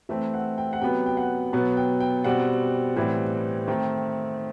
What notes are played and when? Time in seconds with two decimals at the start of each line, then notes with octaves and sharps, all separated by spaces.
0.09 E3 A3 C4 E5
0.34 F#5
0.58 G5
0.73 F#5
0.81 C3 F#3 B3 G5
1.06 G5
1.17 F#5
1.53 B2 F#3 B3
1.77 G5
2.00 G5
2.24 B2 G3 C4 F#5
2.96 A2 E3 G3 C4
3.68 D#3 A3 C4 G5